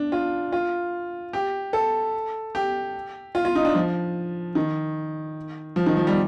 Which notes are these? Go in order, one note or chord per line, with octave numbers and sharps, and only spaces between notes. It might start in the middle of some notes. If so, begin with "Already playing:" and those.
Already playing: D4
F4
F4
G4
A4
G4
F4
F4
D#4
D4
F3
D#3
F3
D#3
F3
G3